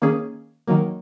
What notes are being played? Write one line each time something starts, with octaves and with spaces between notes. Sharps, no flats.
D#3 A#3 C#4 G#4
D#3 F#3 A#3